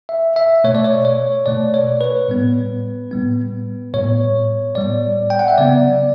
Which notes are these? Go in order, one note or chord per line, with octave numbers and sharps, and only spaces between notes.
E5
E5
B2 A3 C#5
D5
C#5
C#5
B2 A3 D5
C#5
B4
A2 G3 B3
A2 G3 B3
A2 G3 B3 C#5
A2 G3 B3 D5
G5
F#5
E5
C#3 F#3 B3 D5